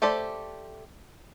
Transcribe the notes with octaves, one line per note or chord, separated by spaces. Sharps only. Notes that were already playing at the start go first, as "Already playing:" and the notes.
A3 G4 A4 C5 D5